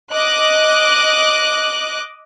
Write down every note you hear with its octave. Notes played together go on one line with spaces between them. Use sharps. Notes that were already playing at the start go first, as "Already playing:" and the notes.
D#5 D6 F#6